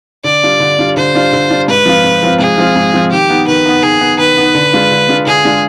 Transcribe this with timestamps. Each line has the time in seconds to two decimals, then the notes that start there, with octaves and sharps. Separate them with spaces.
0.24 D3 D5
0.43 G3 D4 F4
0.60 D3
0.79 G3 D4 F4
0.96 D3 C5
1.14 G3 D4 F4
1.33 D3
1.50 G3 D4 F4
1.68 G#2 B4
1.86 F3 C4 F4
2.04 G#2
2.22 F3 C4 F4
2.39 G#2 G#4
2.58 F3 C4 F4
2.76 G#2
2.94 F3 C4 F4
3.11 D#3 G4
3.30 B3 D#4
3.47 D#3 B4
3.66 B3 D#4
3.83 D#3 G#4
4.01 B3 D#4
4.19 D#3 B4
4.37 B3 D#4
4.55 D3
4.73 G#3 D4 F4
4.91 D3
5.09 G#3 D4 F4
5.27 D3 G#4
5.45 G#3 D4 F4